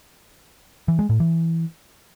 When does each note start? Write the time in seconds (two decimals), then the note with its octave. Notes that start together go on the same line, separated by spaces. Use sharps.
0.88 E3
0.99 G#3
1.09 A2
1.20 E3